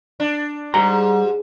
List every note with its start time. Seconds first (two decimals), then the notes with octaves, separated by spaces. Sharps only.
0.20 D4
0.74 G#2 G3 A#5